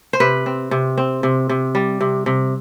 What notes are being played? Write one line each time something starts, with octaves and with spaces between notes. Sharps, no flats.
C5
C3 B4
C4
C3
C4
C3
C3
G3
C3
C3